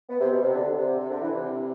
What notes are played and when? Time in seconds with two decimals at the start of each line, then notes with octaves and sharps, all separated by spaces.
0.09 B3
0.21 C3
0.31 B2
0.42 C3
0.53 D3
0.76 C3
0.98 C3
1.10 D3
1.21 E3
1.33 C3